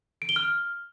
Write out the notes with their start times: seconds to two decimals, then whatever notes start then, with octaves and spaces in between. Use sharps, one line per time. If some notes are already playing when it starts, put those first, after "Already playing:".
0.22 D7
0.29 G7
0.36 F6